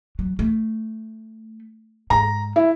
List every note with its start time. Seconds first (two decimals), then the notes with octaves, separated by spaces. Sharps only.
0.19 F#3
0.39 A3
2.10 G#2 G#3 A#5
2.56 E4